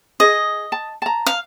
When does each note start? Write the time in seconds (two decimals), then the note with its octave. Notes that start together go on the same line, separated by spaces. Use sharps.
0.20 G#4 D#5
0.72 A5
1.02 A5 A#5
1.26 F5